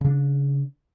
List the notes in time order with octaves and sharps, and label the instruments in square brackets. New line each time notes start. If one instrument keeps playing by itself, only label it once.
[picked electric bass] C#3 D4